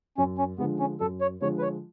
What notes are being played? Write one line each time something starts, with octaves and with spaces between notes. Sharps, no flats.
F#2 C#4
C#4
D3 F3 G#3 B3
C#4
F#2 A4
C#5
D3 F3 G#3 C#5
B4
C#5